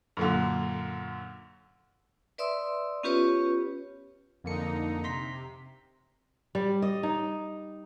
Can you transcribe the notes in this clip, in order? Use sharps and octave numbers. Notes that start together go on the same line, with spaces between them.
F#2 A#2 D3
B4 D5 E5 C6 D#6 E6
B3 C#4 F4 G4 B4 C#5
F2 D3 A#3 D#4 C#7
C3 A#5 C6 B6
G3
D#5
D#4